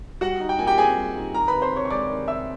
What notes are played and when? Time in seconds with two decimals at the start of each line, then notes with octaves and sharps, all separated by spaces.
0.21 G3 F#4 F#5
0.40 D#4
0.49 G5
0.59 A#2 G#5
0.67 G4 G5
0.77 C4 G#4 G#5
0.96 G3
1.16 D#4
1.34 D#3 A#4 A#5
1.48 B4 B5
1.53 C3
1.62 C5 C6
1.72 C3 C#5 C#6
1.85 C#6
1.90 G#3 D5 D6
2.09 D#3
2.28 C3 E5 E6